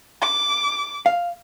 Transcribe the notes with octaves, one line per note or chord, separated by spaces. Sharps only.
D6
F5